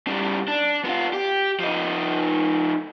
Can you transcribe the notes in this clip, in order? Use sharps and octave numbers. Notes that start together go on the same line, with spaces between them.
C#3 G3
D4
B3 F4
G4
F3 D#4